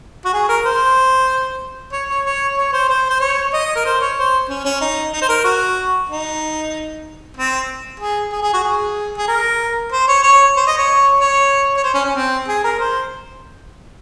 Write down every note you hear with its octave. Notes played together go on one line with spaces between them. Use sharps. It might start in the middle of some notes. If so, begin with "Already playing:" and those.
F#4
G#4
A#4
C5
C#5
C#5
C#5
C#5
C5
C5
C5
C#5
D#5
A#4
C5
C#5
C5
C#4
C#4
D#4
D#4
C5
A#4
F#4
D#4
C4
G#4
G#4
G#4
F#4
G#4
G#4
A#4
C5
C#5
C#5
C5
D#5
C#5
C#5
C#5
C5
C#4
C#4
C4
G#4
A#4
C5